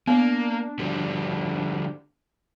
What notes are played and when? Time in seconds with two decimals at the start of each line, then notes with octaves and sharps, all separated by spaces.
0.07 A#3 B3 D4
0.79 D3 F3 G3